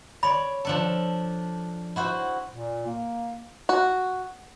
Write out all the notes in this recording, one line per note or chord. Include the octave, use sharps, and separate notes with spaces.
C#5 D5 B5
F3 D4 A4
E4 F#4 C5
A#2
A#3
F#4